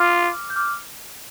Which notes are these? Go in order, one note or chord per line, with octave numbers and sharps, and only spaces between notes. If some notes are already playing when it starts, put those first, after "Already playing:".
Already playing: F4 D6 F6
G6
D6 F6